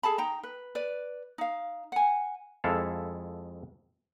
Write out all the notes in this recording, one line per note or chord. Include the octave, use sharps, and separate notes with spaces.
G#4 A4 A5 B5
D#4 G5 A#5
B4
B4 D5
D#4 F5
F#5 G#5
F2 G#3 E4 A4 F5